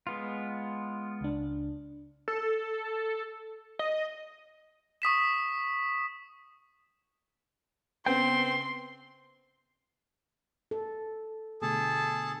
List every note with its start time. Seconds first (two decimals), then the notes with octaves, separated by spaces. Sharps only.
0.07 G#3 B3 F4
1.21 C#2 D4
2.28 A4
3.79 D#5
5.02 C#6 D#6 B6 E7
8.06 C#3 B3 C4 G5 C6 C7
10.71 A4
11.62 B2 D3 A3 G#4 A4 A5